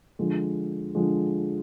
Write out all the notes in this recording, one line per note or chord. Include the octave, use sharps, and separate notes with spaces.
D3 F3 G#3
D3 F3 G#3